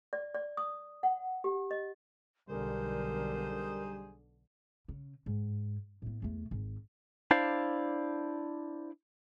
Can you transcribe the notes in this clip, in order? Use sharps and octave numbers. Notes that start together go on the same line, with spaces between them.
D5
D5
D#6
F#5
G4
D#5
B1 D3 G3 D#4 G#4 A#4 C5
C#3
G#2
A2 B3
E2 A3
G#1
D4 E4 C5 D5 F5